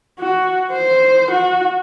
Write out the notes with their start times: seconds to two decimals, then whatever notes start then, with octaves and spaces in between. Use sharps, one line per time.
0.19 F#4
0.73 C5
1.32 F#4